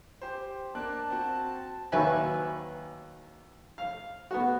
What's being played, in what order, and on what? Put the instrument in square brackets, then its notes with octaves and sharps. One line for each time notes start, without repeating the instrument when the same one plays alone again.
[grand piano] G4 C5
[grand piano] A#3 D4 F#6 [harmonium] A5
[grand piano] C4 F#4
[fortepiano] D#2 F#3 B4 E5 G#5 B5
F5
B3 F#4